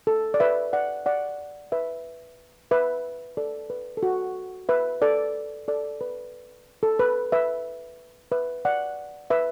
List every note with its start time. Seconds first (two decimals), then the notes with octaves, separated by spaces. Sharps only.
0.07 A4
0.34 D5
0.40 B4 E5
0.73 D5 F#5
1.06 D5 F#5
1.72 B4 E5
2.71 B4 E5
3.37 A4 D5
3.70 B4
3.97 A4
4.03 F#4
4.69 B4 E5
5.02 A4 D5
5.68 A4 D5
6.01 B4
6.83 A4
6.99 B4
7.32 B4 E5
8.32 B4 E5
8.65 D5 F#5
9.30 B4 E5